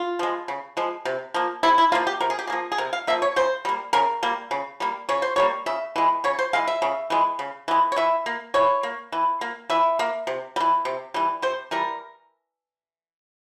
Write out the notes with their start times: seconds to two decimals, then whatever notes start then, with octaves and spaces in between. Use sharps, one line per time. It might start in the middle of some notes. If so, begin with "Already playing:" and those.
Already playing: F4
0.19 F3 G#3
0.48 C#3
0.77 F3 G#3
1.05 C3
1.34 F3 A#3
1.63 C3 E4
1.78 E4
1.92 F3 A#3 F4
2.07 G4
2.21 C3 A#4
2.30 G#4
2.39 G4
2.47 F3 A#3 G#4
2.72 G#4
2.78 C3 A#4
2.93 F5
3.07 F3 A#3 E5
3.22 C#5
3.36 C#3 C5
3.65 G3 A#3
3.93 C#3 A#4
4.23 G3 A#3
4.51 C#3
4.80 G3 A#3
5.09 C#3 C#5
5.22 C5
5.36 G3 A#3 C#5
5.66 C#3 E5
5.96 E3 G#3
6.24 C#3 C#5
6.39 C5
6.53 E3 G#3 F5
6.68 E5
6.82 C#3
7.10 E3 G#3
7.39 C#3
7.68 E3 G#3
7.92 C#5
7.96 E3 E5
8.26 A#3
8.54 E3 C#5
8.83 A#3
9.12 E3
9.41 A#3
9.70 E3 E5
9.99 A#3
10.27 C3
10.56 G3
10.61 E3
10.85 C3
11.14 E3 G3
11.42 C3 C5
11.71 E3 G3 A#4